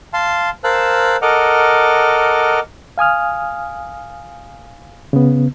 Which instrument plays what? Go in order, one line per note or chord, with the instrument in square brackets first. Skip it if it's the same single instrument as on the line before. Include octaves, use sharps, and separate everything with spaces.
[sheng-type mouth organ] F5 A5 C6
A#4 C5 F5 A5 E6 F#6
A4 A#4 D#5 F#5 D6 F6
[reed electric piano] F5 G#5 D#6 F6
C#3 B3